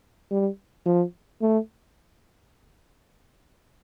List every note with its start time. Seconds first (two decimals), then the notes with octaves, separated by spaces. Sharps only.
0.31 G3
0.86 F3
1.42 A3